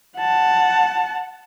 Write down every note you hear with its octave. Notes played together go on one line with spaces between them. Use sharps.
F#5 A5